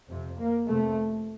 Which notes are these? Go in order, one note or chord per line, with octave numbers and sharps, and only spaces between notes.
F2 C3
A#3
F2 C3 A3